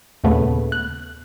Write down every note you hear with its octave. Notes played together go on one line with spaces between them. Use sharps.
D#2 A#2 C#3 A3 B3
F#6